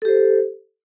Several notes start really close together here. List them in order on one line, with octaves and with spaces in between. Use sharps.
A4 G4 C5